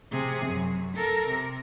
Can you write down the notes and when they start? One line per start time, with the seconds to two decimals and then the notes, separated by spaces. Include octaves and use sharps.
0.12 C3 G#4
0.46 F#2
0.95 A4 A#4
1.28 C3